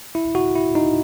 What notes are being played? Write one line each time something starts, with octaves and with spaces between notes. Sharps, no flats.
E4
F#4
E4
D#4